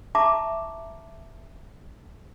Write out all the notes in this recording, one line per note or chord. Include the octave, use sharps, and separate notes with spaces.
E5 A5 A#5 C#6 D6